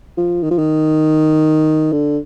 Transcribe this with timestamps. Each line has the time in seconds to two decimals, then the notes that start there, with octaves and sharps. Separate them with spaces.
0.17 F3
0.43 D#3
0.51 F3
0.58 D#3
1.92 D3